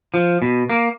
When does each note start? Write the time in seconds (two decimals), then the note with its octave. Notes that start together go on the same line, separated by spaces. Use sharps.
0.14 F3
0.42 B2
0.70 A#3